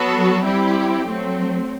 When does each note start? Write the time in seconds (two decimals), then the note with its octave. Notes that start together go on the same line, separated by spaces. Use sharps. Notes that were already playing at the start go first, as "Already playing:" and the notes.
Already playing: F#3 B3 F#4 A4
0.44 G3 C4 E4 G4
1.06 F#3 A3 C4